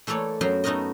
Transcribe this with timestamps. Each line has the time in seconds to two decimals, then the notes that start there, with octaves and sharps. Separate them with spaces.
0.07 E3 A3 A#3 A4 C#5 D5
0.41 F#2 F#3 B3 F#4 F5 G5
0.64 A3 B3 D#4 F#4 A#4 D#5